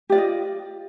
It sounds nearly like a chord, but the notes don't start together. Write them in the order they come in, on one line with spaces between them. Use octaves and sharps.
G4 D5 F4 D#5